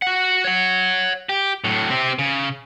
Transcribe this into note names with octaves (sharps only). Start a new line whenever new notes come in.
F#4 F#5
C#5 F#5
G4
A2 F#3
C4 G4
C#3